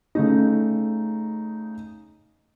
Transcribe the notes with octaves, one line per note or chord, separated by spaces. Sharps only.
C#3 A3 D#4